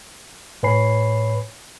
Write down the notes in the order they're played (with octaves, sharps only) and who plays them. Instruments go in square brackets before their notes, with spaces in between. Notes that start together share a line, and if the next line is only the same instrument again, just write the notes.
[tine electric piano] A2 B4 C#5 G#5 B5 C7